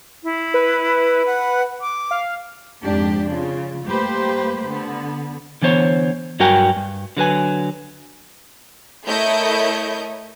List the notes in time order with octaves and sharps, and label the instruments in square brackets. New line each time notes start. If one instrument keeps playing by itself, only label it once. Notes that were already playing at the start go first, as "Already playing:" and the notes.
[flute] E4
[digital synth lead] B4
[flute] F#5
D6
[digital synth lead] F5
[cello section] F2 G#2 D4 G4
C#3 F4
G3 A3 A#3 G4 B4 C5
D3 B3
[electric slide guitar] D3 E3 B3 C5 C#5
G2 F#3 F#4 A#4 G5 G#5
G2
D3 F#3 B4 G#5
[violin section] A3 E4 A#4 C#5 D#5 G6